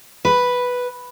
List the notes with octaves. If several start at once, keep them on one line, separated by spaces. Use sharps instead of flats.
B4